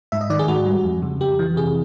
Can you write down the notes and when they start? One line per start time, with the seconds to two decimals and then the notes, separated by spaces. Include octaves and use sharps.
0.12 G#2 E5
0.21 D#5
0.30 D#3 D5
0.39 G#4
0.48 G#2 F#4
0.66 G3
0.84 F2
1.02 C#3
1.21 F2 G4
1.39 E3
1.56 C3 G#4